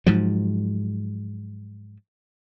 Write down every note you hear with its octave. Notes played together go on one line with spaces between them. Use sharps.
G#2 F3 F#3